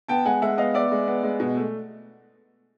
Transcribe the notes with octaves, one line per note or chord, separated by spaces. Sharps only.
B3 G5 A5
G#3 F#5 G#5
G#3 E5 F#5
B3 D#5 F5
B3 D5 E5
G#3
B3
G#3
B2
A3